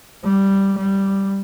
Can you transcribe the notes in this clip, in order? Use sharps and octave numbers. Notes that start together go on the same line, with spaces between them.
G3
G3